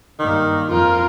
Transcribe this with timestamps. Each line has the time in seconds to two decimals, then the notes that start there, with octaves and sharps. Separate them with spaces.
0.19 G2 D#3 A#3
0.69 F2 F3 F4 A#4